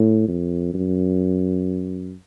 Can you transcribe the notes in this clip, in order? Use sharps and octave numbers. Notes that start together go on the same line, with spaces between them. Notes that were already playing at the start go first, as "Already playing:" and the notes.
Already playing: A2
F2
F#2